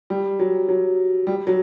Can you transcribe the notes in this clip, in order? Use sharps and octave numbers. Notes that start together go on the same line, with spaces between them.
G3
F#3
F#3
G3
F#3